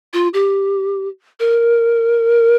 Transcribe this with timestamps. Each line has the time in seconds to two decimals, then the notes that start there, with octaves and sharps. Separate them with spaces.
0.13 F4
0.34 G4
1.40 A#4